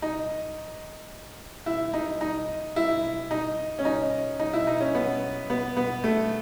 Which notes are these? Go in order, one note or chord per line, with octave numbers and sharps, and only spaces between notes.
D#4
E4
D#4
D#4
E4
D#4
C#4
D#4
D#4
E4
D#4
C#4
B3
B3
B3
A3